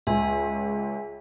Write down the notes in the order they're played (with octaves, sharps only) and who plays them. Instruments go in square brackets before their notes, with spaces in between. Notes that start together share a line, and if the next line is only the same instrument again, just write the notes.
[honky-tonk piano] C#2 [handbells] E5 G#5